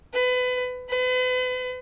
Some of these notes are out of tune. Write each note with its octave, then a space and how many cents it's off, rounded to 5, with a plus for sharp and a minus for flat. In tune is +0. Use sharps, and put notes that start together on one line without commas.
B4 +25
B4 +40